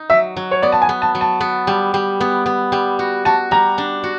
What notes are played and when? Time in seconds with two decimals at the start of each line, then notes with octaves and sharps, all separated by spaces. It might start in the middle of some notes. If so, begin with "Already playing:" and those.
Already playing: D#4
0.10 F#3 E5
0.36 F#3
0.51 C#5
0.63 B3 D5
0.72 A5
0.82 G#5
0.89 B3
1.02 A5
1.15 F#3
1.21 A5
1.40 B3
1.67 G3
1.94 G3
2.20 B3
2.46 B3
2.72 G3
2.99 F#4
3.25 F#4 A5
3.51 G3 A#5
3.78 D4
4.03 F#4